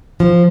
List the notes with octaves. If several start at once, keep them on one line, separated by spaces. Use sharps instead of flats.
F3